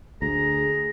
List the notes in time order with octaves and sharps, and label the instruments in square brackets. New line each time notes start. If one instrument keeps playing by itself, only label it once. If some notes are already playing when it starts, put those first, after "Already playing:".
[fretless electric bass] D2 [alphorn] G#4 [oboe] A#5